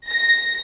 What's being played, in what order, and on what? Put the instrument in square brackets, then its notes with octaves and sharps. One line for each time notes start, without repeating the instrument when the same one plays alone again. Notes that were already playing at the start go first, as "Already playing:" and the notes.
[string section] A#6